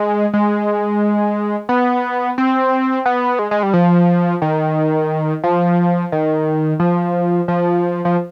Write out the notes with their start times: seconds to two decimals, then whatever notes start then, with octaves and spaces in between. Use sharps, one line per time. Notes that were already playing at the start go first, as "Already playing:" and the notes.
Already playing: G#3
0.34 G#3
1.69 B3
2.38 C4
3.06 B3
3.39 G#3
3.51 G#3
3.63 G3
3.73 F3
4.42 D#3
5.44 F3
6.12 D#3
6.80 F3
7.48 F3
8.05 F3